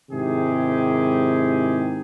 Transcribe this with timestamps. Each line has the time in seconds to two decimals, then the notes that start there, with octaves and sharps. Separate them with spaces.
0.11 G#2 C3 D#3 E4 G4 G#4